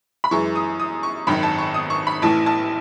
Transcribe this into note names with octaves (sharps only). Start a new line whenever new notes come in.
B5
F#2 E3 G#3 C#6
D#6
D#6
C#6
G#1 F#2 D#3 B5
A5
C#6
D#6
C#6
B5
A1 A2 E3 A5
A5